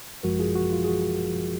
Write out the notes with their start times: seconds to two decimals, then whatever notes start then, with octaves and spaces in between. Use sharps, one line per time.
0.23 G#1 F#2 F3 G#3 F#4 A#4
0.39 F4 G#4
0.55 F#4
0.73 F4
0.84 G#4
0.88 F#4